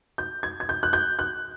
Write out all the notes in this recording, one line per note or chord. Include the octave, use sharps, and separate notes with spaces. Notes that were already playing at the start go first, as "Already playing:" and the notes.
G6
G#6
G#6
G6
F#6
G6
F#6